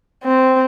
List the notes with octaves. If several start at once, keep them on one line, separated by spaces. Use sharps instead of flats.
C4